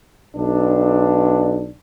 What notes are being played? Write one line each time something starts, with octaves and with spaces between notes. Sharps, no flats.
B1 D4